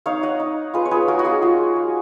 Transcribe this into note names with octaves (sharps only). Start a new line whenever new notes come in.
D#4 C#5 F5
D#5 F#5
D#4
F4 G#4 B4
C#5
G#4 B4
A#3 F#4 A#4
F#4
F4 G#4
F4 F#4
A#3